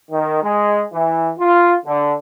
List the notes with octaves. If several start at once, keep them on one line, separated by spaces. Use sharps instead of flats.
D#3
G#3
E3
F4
D3